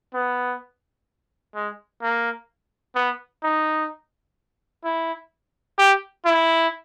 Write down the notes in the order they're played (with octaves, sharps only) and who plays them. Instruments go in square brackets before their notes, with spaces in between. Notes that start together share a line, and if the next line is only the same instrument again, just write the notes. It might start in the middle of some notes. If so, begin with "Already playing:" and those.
[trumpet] B3
G#3
A#3
B3
D#4
E4
G4
E4